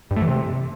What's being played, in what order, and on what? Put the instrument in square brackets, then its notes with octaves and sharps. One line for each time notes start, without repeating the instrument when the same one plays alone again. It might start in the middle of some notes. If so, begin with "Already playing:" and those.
[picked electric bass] G2
A3
E3
C3